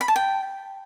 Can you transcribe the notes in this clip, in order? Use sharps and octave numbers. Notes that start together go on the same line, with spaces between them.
B5
A5
G5